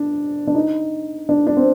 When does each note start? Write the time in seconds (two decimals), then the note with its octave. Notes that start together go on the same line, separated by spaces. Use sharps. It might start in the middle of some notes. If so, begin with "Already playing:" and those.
Already playing: D4
0.47 D4
0.55 D#4
1.29 D4
1.47 D4
1.57 C4